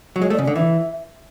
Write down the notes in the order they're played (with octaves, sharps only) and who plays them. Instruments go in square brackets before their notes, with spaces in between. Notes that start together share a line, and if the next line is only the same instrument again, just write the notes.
[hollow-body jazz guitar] F#3
[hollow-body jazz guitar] G#3 [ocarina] C#5
[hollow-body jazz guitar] A3
[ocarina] D5
[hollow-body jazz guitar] C#3
[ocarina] D5
[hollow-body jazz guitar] D3
[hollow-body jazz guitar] E3 [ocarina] E5